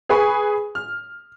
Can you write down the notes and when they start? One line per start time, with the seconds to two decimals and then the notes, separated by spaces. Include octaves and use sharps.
0.09 G#4 B4 G#5 B5 C#6
0.75 F6